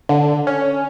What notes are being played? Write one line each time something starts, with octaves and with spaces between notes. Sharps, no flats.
D3
C#4